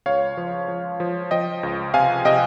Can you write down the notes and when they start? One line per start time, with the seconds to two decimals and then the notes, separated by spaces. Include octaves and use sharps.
0.06 C#2 C#5 F5
0.37 F3
0.68 F3
1.00 F3
1.31 F3 D#5 G5
1.63 C#2
1.94 C3 F5 G#5
2.25 C3 D#5 G5